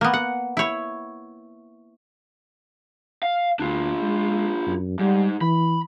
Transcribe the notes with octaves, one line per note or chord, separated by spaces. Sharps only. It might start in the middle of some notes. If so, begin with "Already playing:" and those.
A#3 B3
F#5
E4 C#5
F5
D2 D4 F4
G#3
F#2
G#2 G3
E3 B5